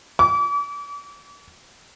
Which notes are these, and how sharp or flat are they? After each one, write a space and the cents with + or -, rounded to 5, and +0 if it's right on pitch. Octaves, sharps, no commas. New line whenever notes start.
D6 -40